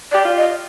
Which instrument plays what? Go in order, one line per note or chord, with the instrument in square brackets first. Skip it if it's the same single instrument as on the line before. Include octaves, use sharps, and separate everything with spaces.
[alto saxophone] G4 [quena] D5
[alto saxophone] F4
[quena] D#5